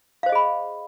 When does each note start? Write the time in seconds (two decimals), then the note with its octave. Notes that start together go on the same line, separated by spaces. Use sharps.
0.23 F5
0.26 C5
0.29 D#5
0.32 G#4
0.35 B5